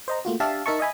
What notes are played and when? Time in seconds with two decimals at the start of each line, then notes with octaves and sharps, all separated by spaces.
0.08 C5 D#5 A#5
0.25 A3 A#3 F4 F#4
0.40 D4 G4 E5 F5 A5
0.66 D#4 A#4 E5 A5 C#6
0.80 D#5 E5 G#5 B5